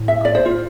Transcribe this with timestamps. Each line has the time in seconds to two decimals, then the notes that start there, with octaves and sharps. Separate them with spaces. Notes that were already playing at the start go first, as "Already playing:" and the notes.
Already playing: A2
0.08 E5
0.25 D5
0.35 C5
0.46 F4